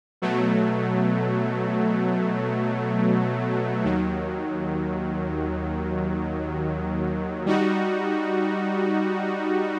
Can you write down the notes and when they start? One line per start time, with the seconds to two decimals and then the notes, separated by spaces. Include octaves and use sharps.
0.22 B2 F#3 A3
3.84 D#2 D#3 F#3
7.46 G3 D#4 F#4